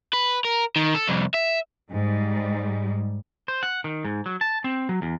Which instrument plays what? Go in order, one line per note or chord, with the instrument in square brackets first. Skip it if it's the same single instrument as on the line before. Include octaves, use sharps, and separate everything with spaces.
[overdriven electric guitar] B4
A#4
D#3
A4
C2 F2
E5
[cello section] G#2 G3
[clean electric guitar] C5
F#5
D#3
G#2
F#3
A5
C4
F#3
E2